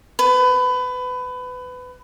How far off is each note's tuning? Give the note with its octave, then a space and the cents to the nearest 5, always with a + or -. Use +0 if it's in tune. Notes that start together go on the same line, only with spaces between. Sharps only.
B4 +25